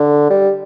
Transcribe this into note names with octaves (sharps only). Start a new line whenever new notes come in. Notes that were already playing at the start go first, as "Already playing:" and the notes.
Already playing: D3
G3